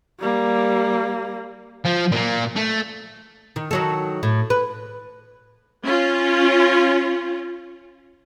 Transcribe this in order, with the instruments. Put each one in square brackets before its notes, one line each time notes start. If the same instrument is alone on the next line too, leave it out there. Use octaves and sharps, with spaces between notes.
[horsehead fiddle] G3 A#3
[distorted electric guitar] F3
A#2 A#3
A3
[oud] D#3
D#3 F#3 A4
A2
B4
[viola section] C#4 F4